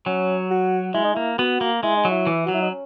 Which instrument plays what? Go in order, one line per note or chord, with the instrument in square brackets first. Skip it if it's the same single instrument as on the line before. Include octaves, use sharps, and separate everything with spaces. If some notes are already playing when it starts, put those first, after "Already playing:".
[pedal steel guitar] F#3 [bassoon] C#4
[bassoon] F#4
[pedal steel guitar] G#3 [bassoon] E4
[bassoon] D#4
[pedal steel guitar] A#3 [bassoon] E4
[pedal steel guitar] B3 [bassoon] F#4
[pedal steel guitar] A#3
[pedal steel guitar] G#3 [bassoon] E4
[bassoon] D#4
[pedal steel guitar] F#3
[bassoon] E4
[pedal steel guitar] E3
[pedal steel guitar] F#3 [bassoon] F#4
[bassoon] E4
D#4
C#4